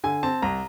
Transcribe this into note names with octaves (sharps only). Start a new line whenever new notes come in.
D3 G#5
C4 A5
C2 A#5